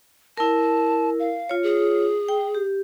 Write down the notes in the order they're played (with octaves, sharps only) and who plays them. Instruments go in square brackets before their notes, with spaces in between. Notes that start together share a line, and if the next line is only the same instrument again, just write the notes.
[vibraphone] E4 A#4 [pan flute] A5
[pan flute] F5
[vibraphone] F4 C#5
[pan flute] G#4
[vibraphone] G5
G4